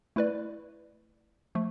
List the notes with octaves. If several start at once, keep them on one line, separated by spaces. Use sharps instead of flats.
A3 E4 B4 D5
F3 A3